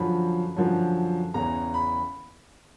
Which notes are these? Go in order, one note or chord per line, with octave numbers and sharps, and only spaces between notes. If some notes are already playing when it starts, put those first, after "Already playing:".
Already playing: F#2 D3 F3 B5
F#2 D3 F3
E2 C#3 E3 A#5
B5